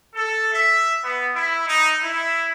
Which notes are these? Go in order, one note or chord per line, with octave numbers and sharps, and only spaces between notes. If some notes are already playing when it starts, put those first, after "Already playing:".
A4
E5
B3
E4
D#4
E4